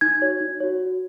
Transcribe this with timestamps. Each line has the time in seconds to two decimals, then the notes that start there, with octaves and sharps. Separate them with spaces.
0.01 D#4 G#6
0.22 F#4 C#5
0.41 D#4
0.60 F#4 C#5
0.80 F#4